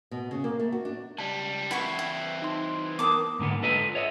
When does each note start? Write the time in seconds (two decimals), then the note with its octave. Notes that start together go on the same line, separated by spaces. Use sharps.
0.11 B2
0.31 C#3
0.44 A#3
0.59 A3
0.72 F#4
0.85 D4
1.18 C#2 G3 A5
1.71 E3 C4 E4 F#5 C#6
1.99 E4
2.42 D#4 C6
2.99 B3 A#4 A5 D6 D#6
3.39 G#2 D3 A#3 B3
3.62 D4 F4 A4 B4 D#5
3.95 C#5 D#5 E5